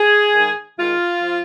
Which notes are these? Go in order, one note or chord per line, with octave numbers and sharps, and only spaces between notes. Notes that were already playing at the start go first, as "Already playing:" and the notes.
Already playing: G#4
G#2 D#3
G#2 D#3 F4
F3